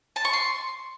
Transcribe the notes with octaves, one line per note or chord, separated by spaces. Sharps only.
A5
C#6
C6